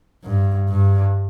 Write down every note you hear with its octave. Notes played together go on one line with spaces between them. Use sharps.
G2
G2